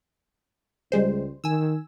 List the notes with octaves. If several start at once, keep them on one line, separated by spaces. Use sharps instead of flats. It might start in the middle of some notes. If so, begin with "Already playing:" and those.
C#2 G3 G#3 C5
D#3 G#5 E6